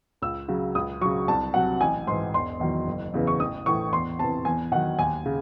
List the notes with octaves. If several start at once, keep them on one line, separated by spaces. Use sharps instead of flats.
C#2 E6
C#3 F#3
C#2 D#6
C#3 F#3 C#6
C2 A5
C3 F#3 F#5
A1 G#5
G#2 E3 C6
E1 C6
E2 D#3 F#3
F#1
E2 C#3 E3
C#6
A1 D#6
A2 E3 C#6
E2 C6
C3 E3 A5
E2 G#5
D#3 F#3 F#5
D#2 G#5
C#3